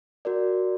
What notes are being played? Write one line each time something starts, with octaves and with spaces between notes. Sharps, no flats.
F#4 A#4 D5